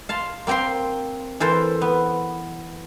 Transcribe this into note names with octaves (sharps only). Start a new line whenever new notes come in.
F5 A5 C6
A#3 C4 G5 A#5 C6
E3 A4 A#4 C5
B3